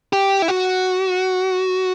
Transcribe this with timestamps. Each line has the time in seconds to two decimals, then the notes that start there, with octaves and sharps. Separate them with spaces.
0.13 G4
0.42 E4
0.48 F#4